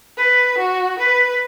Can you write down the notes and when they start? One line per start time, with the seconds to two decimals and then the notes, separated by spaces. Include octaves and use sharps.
0.17 B4
0.58 F#4
0.98 B4